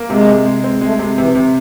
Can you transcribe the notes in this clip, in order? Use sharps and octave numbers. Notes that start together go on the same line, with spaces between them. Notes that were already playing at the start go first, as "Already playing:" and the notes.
Already playing: A#3
C3 G#3
C3
G#3
C4
G#3 A3
C3
C3 E3
C3